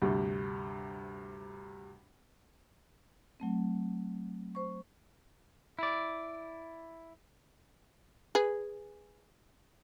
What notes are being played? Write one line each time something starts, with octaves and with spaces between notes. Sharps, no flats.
D2 G2 C3
F#3 A3 C4
C5 C#6
E4 D5
G#4 B4